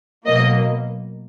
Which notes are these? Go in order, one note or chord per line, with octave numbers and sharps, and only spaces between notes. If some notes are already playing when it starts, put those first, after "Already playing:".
B2 F#3 A#3 D#5